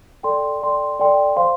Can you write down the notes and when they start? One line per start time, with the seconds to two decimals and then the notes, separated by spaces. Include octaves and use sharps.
0.23 A4 D5 G5 C6
0.62 A4 D5 G5 C6
0.99 A4 D5 G5 C6
1.36 C5 F5 C6